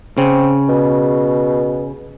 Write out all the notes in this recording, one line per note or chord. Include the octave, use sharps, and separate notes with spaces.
C#3 C4
B2